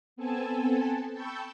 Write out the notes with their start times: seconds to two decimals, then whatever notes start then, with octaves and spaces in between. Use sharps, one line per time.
0.16 B3 C4 A4 G#5 A5
1.13 G5 A5 B5 C#6 E6 G6